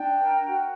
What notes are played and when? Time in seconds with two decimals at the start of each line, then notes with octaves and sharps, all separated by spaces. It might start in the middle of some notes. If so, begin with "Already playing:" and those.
Already playing: D4 G5
0.18 A#4
0.43 F#4